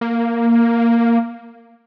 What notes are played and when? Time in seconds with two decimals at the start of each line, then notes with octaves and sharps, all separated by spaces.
0.01 A#3